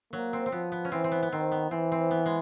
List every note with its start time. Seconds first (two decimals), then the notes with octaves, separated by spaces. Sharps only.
0.13 F#3 A#3
0.33 C4
0.46 C4
0.52 F3 B3
0.72 B3
0.85 C#4
0.92 E3 C4
1.04 C4
1.12 B3
1.23 B3
1.32 D#3 C4
1.52 B3
1.71 E3 C4
1.92 C4
2.11 B3
2.26 G#3